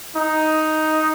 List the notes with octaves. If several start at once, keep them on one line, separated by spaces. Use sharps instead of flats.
D#4